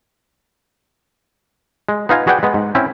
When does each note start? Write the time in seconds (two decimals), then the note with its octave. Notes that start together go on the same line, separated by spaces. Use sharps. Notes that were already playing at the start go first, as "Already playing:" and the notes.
1.89 G#3
2.09 B3 D#4 F4 F5 G#5
2.27 F#4 G#4 B4 D5 F#5 G5
2.43 G#3 B3
2.54 G#2
2.75 C4 C#4 E4